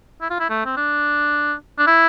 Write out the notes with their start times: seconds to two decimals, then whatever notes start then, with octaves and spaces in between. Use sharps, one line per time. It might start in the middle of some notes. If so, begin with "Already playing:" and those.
0.21 E4
0.30 F4
0.40 E4
0.50 A3
0.66 C4
0.77 D4
1.78 D4
1.87 E4